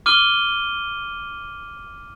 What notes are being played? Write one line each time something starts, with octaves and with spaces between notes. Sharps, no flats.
D6 F6 D#7 G7